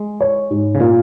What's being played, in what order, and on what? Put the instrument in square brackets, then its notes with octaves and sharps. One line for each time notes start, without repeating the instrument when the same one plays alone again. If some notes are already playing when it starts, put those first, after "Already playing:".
Already playing: [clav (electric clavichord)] G#3
[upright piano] C#5
G#2
[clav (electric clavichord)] C#3
[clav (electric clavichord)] A#2 [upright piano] F4